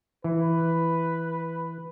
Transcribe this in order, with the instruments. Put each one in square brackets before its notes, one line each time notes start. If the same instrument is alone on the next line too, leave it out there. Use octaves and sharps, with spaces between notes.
[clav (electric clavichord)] E3 [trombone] B4